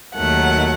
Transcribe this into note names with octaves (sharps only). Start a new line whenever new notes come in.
D#2 D#3 F#3 A3 F#5